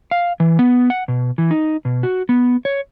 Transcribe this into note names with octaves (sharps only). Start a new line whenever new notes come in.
F5
E3
B3
F#5
B2
E3
D#4
B2
F#4
B3
C#5